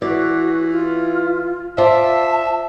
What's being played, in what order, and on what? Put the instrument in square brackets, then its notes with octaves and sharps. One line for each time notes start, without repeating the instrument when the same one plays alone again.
[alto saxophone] E3 [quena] F#4 [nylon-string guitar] D5
[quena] F4
[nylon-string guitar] F4 C5 D5 [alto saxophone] E5 [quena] A5